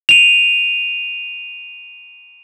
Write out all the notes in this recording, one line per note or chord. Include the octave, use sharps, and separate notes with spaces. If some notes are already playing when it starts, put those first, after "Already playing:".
D#7 F7